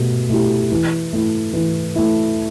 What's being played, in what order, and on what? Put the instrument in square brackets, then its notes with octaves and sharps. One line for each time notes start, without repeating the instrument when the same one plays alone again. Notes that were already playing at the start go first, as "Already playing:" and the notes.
Already playing: [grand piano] B2 A3 G4
A3 E4 G4
E3
A3 E4
E3
A3 E4